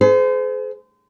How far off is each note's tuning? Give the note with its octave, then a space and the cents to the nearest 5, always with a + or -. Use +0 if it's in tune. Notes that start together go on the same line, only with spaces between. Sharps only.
G#4 +40 C5 -35